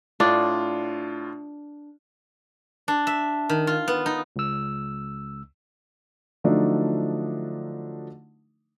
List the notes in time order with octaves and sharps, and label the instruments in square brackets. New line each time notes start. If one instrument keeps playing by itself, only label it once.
[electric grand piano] A2 F4 [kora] D4
[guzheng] D4
E5
D#3
F4
B3
D#4
[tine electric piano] C#2 E6
[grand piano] D3 F3 F#3 A3 D4 D#4